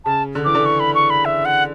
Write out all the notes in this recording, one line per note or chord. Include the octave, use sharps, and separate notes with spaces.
C#3 A5
D3
E3 D6
D3
C#6
B5
C#6
B5
E5
F#5